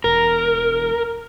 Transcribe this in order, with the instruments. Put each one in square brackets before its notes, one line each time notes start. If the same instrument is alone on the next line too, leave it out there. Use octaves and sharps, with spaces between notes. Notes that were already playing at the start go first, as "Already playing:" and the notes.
[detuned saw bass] E1 [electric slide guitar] A#4